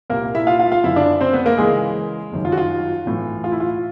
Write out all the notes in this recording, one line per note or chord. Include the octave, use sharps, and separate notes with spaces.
C2 A#2 A#3 A#4
E4 E5
F4 F5
F4 F5
F4 F5
F#1 F#2 D3 E4 E5
D4 D5
C4 C5
B3 B4
A#3 A#4
C#2 C#3 E3 G#3 G#4
G1 F#2 D#3
F4
F#4
F4
B1 A2 E3
F4
E4
F4